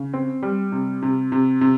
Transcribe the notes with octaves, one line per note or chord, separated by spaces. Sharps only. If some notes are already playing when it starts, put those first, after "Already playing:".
Already playing: C#3
C4
G3
C3
C3
C3
C3